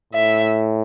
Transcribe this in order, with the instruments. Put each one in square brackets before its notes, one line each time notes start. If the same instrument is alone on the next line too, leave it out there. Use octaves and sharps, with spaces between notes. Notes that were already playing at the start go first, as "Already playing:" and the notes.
[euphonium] A2 [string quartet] E5